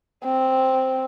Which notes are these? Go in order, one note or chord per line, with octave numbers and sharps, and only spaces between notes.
C4